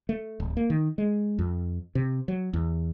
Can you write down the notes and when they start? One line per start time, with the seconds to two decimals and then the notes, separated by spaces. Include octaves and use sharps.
0.09 A3
0.40 D1
0.57 A#3
0.70 D#3
0.98 G#3
1.39 F2
1.95 C3
2.28 F#3
2.53 E2